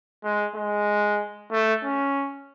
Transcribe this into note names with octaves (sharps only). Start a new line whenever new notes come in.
G#3
G#3
A3
C#4